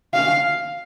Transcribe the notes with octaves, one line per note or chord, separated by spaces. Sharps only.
F5